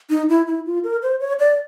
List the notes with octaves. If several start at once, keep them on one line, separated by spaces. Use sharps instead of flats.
D#4
E4
E4
F4
A#4
C5
C#5
D5